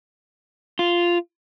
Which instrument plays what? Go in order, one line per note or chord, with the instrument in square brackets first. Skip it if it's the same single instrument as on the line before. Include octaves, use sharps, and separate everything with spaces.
[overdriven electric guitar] F4